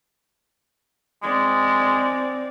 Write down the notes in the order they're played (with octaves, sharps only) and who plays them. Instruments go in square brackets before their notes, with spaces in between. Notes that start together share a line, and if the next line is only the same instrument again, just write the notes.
[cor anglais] G#3 [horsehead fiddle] C4 D5